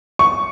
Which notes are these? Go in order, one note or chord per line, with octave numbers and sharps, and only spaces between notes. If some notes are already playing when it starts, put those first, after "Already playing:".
C#6